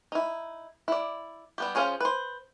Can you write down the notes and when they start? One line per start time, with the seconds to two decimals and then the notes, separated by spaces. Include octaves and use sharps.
0.12 D#4 E4
0.88 E4 D5
1.58 G3 B3 G4
1.75 F3 C#4 G#4 C5 F5
2.00 B4 C5